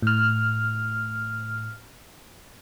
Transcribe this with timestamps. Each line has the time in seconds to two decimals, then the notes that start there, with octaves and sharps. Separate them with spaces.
0.02 A2 F6